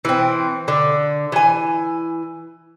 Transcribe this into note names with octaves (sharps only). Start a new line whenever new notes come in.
E3 C4
D3
E3 G#5